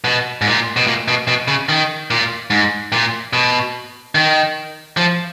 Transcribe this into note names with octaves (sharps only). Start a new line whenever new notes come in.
B2
G#2
A#2
B2
A#2
B2
B2
C#3
D#3
A#2
G#2
A#2
B2
D#3
F3